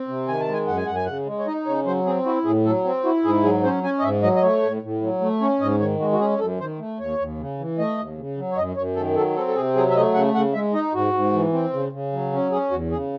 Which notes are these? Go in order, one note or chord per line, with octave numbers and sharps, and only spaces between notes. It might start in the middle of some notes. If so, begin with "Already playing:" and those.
Already playing: C4
C3
D#3 G#5
A5
G#3
G#5
F#2 F#5
G#5
F#2 F#5
G#5
C#3 F#5
G#3
C#5
D#4 D#5
C#3 C#5
F#3 C5
C4 G#4
E4 F#4
A2 G#4
F#3 A4
C4
E4 F#4
G#2 G#4
F#3 G#4
C#4 C5
C#4 G#5
D#5
G#2 E5
F#3 D#5
D#5
A3 C#5
A2
A2
F#3
A3
C#4 C#5
G#2 D#5
D#3 C#5
G#3 F#4
F#4
C#4 G#4
F#2 A4
D#3 C5
A3
D#2 C#5
D#2
C#3
E3
A3 D#5
D#2
C#3
F#3
C#5
F#2 D#5
F#2 C#5
D#3 A4
F#3 A4
C4 A4
A4
C3 G#4
F#3 G#4
E5
A3 D#5
C#3 F#5
C#3 F#5
G#3 E5
D#4 D#5
G#2 F#4
G#2
E3
C4
C#3
C#3
F#3
C#4
C#4 G#4
E2 F#4
C#3 G#4